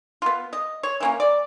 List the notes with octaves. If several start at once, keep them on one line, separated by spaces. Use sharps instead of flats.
B3 F4
D#5
C#5
E3 A#3 C#4
D5